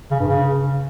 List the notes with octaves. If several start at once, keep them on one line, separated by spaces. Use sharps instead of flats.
C#3
G2
C#3